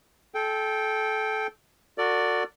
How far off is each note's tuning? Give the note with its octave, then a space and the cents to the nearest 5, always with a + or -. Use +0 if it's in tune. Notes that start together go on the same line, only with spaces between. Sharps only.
A4 -25 G5 +0
F#4 -15 A4 +45 D5 -5